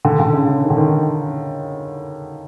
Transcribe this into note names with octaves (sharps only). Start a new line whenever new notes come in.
D3
D3
C#3
C#3
D#3
D3
D#3